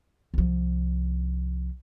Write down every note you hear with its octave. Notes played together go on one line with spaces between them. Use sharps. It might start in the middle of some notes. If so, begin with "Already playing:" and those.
C2 F3